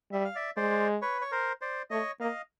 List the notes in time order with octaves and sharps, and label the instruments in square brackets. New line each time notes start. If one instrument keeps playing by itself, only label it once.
[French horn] G3 [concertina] E5
[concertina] F5
D5 E5
[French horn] G#3 [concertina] C5 D5
[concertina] B4 C#5
C#5
A#4 C5
C5 D5
[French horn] A3 [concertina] C#5 D#5
[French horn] A#3 [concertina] D#5 F5